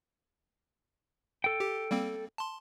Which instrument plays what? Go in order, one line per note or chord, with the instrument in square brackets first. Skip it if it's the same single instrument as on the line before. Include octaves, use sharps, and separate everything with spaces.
[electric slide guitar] A4 G5
[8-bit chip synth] G4
G3 A#3 C4
A5 C6